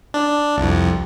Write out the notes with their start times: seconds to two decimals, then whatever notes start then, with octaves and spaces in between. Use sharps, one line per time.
0.14 D4
0.57 C2 F2